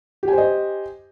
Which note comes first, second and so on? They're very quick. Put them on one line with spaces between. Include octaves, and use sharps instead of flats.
G4 G#5 C5 D#5